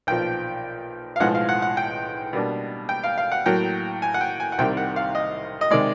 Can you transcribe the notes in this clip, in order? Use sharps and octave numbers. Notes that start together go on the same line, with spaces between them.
B1 A#2 F3 G5
F5
B1 A2 F3 G#3 F#5
F5
F#5
F#5
G5
B2 G3 A#3 D4
G5
F5
F5
F#5
A2 F#3 A#3 G5
G#5
F#5
G5
G#5
F#5
C2 C3 D#3 G3 G5
F#5
F5
D#5
D#5
C3 D#3 G#3 D5